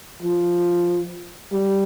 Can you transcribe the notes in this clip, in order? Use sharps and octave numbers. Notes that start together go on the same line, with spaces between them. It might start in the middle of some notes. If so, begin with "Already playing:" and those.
F3
G3